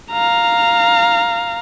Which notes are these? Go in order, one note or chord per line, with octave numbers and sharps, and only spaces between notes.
F5 A#5